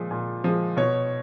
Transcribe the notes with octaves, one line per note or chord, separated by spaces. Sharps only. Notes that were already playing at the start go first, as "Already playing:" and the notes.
Already playing: A#2 F3 G#3
A#2
F3 G#3
B2 C#5